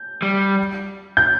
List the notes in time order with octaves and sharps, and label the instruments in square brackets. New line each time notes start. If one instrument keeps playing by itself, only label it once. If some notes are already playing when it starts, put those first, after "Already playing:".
Already playing: [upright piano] G6
[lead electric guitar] G3
[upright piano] G6